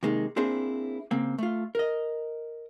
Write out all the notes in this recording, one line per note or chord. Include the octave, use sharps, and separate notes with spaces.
C3 D#3 G#3 A#3 D#4
A#3 C4 D4 E4 G#4 C5
C#3 A#3 C4
A3 F4
A#4 D#5